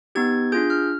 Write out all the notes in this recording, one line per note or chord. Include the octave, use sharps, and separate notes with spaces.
B3 D#4 G4 G#6
D4 F4 G#4 G6
F6